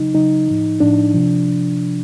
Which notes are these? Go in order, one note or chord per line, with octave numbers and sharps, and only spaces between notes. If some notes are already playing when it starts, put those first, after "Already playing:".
Already playing: C#3 F#3 D#4
C#3 F#3 D#4
A2 F3
A2 F3 D4
C3 F3